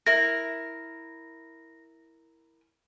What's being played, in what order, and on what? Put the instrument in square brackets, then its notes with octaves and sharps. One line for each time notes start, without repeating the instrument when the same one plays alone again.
[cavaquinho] E4 A#4 [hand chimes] A#6